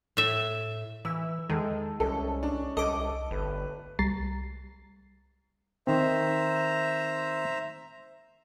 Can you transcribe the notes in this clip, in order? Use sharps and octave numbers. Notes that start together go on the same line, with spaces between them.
A2 E5
E3 E6
E2 D#3 G#3 A4
C2 G#3 C#4 A4
D4
C2 A4 D#5 D6
G1 A2 A3 B4
C2 G3 A#5 A6 C7
D#3 C4 C5 E5 A#5